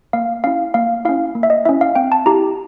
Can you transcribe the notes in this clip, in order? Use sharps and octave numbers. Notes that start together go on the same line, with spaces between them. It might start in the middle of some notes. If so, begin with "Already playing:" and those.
A#3 F5
C#4 E4 F5
A#3 F5
C#4 E4 F5
A#3
E5
D#5
C#4 E4 E5
F5
C4 G5
A5
E4 G4 A#5